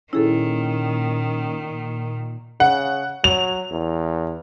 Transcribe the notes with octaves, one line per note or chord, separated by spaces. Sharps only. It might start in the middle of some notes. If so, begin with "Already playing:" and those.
A#2 D#3 C#4 E4 G#4 A4
C#3 F#5
F#3 F7
E2